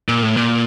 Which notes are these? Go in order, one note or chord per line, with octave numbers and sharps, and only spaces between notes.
A#2
A2
A#2